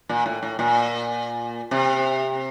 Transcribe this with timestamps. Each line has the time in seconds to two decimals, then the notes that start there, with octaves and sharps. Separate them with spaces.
0.09 A#2
0.26 A2
0.43 A2
0.59 A#2
1.71 C3